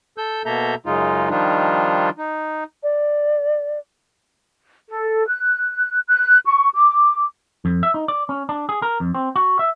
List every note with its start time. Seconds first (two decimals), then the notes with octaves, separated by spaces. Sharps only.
0.18 A4 E6 G6
0.46 B2 A#3 A4 E5 A#5 G6
0.86 F#2 C#3 G#3 D#4 F4
1.30 D#3 F3 G3 D4 D#4 F4
2.18 D#4
2.83 D5
4.89 A4
5.29 F#6
6.08 F#6
6.46 C#6
6.75 D6
7.65 F2
7.83 E5
7.94 D#4
8.08 D5
8.29 C#4
8.49 D4
8.69 G#4
8.82 A#4
9.00 F2
9.14 C4
9.36 F#4
9.59 E5